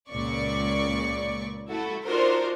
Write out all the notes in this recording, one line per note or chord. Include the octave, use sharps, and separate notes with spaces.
C#2 A#2 C#3 D5 C#6
A3 E4 F#4 A4
D4 D#4 F4 F#4 A#4 C5